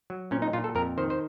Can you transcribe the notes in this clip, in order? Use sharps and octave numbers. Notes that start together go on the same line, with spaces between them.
F#3
A#2 C#4
D#4
A#2 F4
A4
F2 A#4
D#3 C5
C5